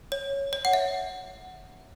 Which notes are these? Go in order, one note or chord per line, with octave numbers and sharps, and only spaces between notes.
C#5
C#5
F#5
E5